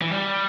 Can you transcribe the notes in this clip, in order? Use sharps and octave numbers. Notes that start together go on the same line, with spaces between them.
E3
G3